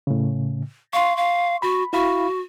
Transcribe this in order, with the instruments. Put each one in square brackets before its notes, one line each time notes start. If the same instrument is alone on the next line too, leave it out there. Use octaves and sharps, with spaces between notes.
[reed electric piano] A2 C#3
[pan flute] F5 [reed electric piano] C6 C#6
[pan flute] F5
[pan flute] F#4 [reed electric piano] B5
[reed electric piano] E4 F5 B5 [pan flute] F#4